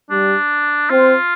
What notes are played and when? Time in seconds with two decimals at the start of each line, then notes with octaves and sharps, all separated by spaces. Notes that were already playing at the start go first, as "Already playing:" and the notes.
0.11 G3 D4
0.91 C4 F4